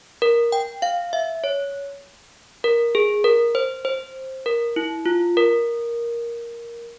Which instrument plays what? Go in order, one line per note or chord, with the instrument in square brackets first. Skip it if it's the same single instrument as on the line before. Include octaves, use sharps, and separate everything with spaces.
[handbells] A#4
G5
F5
E5
C#5
A#4
G#4
A#4
C5
C5
A#4
E4
F4
A#4